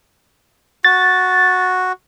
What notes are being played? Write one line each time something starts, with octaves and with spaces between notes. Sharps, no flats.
F#4 A6